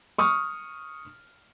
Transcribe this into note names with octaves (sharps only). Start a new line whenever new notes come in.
C#6 D#6 F6